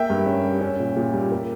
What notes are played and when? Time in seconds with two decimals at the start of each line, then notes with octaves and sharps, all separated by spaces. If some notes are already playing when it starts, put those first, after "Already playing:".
Already playing: A#3 E5 G5
0.10 G2
0.26 C#4
0.44 G3
0.61 C#4
0.80 A#2
0.96 A#2
1.14 G3
1.31 A#3